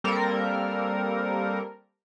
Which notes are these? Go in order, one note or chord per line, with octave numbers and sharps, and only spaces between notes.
G3 A#3 C4 A4 A#4